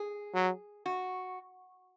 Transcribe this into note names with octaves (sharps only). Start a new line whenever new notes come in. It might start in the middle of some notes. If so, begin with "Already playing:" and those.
Already playing: G#4
F#3
F#4